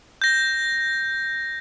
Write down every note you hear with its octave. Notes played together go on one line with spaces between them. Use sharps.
G6 A#6